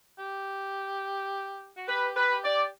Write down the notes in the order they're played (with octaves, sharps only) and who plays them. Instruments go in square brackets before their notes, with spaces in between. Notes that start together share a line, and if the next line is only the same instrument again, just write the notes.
[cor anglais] G4
F#4
[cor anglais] G4 [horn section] B4
[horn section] B4
[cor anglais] G4
[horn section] D5